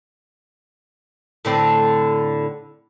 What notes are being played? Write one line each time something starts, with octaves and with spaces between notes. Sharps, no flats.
A2 D3 C4